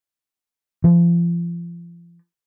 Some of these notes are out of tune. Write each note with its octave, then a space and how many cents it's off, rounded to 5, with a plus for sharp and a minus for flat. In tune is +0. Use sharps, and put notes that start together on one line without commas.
F3 -35